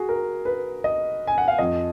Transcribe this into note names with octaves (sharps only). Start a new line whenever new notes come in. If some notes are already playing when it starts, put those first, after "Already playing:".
Already playing: F#4 G#4
A#4
B4
D#5
G#5
F#5
F5
F2 F3 D#5